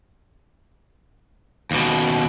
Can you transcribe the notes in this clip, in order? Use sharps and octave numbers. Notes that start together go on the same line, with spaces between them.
D#2 B2